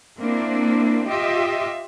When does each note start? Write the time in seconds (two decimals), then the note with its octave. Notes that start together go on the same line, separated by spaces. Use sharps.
0.20 A#3 C4 D4 E4
1.08 F4 G4 D#5 E5